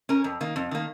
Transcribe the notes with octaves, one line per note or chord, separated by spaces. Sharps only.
C#4 A#4
F2
D#3 A#3
F2
D#3 A#3